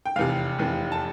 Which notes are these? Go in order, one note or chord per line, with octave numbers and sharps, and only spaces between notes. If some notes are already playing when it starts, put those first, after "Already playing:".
G5
F1 E2 C3 F5
F1 E2 C3
A5